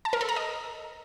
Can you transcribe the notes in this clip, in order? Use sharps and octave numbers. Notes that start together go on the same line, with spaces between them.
A5
A#4
A4
A#5
D#5